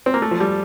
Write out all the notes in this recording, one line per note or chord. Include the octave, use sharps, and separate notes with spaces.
C4
A#3
A3
F3
G3